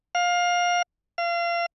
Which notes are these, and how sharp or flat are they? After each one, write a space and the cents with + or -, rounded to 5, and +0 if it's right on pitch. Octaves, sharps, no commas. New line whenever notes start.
F5 +20
F5 -30